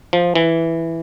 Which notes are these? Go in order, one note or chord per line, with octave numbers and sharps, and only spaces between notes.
F3
E3